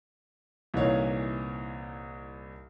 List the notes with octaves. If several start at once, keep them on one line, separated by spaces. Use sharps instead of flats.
C2 A#2 E3 D#4 C#5 F5